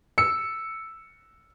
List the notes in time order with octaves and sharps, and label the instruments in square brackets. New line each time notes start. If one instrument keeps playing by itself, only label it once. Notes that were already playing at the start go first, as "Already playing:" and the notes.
[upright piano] E6 C#7